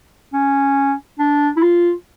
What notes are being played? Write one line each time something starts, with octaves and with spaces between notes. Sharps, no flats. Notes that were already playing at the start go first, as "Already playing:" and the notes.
C#4
D4
E4
F4